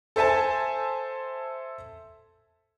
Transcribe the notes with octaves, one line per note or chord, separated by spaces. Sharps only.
A4 C5 E5 G#5 A5